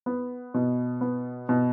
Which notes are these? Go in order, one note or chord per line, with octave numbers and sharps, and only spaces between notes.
B3
B2
B3
B2